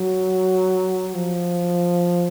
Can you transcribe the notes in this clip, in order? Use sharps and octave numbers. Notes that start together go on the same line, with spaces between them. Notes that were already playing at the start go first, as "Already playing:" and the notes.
Already playing: F#3
F3